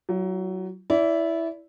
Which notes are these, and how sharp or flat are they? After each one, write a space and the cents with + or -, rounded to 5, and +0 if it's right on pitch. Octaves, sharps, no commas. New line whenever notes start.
F#3 +20 F4 -35
E4 +0 D5 -30